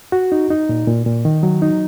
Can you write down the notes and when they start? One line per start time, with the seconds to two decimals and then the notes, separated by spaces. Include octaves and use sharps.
0.12 F#4
0.32 D#4
0.50 D#4
0.69 A#2
0.87 A#2
1.06 A#2
1.25 D#3
1.43 F#3
1.62 D#4